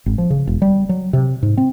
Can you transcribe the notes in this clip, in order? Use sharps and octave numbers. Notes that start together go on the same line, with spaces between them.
G#1
F3
C#3
E1
G3
F#3
C3
G#2
C4